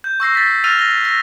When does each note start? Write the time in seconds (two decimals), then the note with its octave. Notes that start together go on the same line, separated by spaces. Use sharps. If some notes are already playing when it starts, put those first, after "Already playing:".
0.04 G6
0.20 C#6 E6 A#6 C7
0.35 A6 B6
0.64 E6 F6 A6 A#6 D#7 F7
0.79 A#6 G7
1.04 E6 A#6